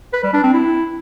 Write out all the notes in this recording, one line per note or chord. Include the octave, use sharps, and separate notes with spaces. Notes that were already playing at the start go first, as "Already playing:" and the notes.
B4
G3
D4
C4
E4